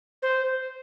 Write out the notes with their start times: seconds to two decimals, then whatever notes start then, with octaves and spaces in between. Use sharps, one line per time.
0.22 C5